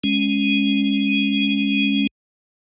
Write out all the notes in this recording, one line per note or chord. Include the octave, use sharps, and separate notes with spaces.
G#3 C#4